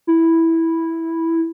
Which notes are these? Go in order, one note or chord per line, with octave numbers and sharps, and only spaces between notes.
E4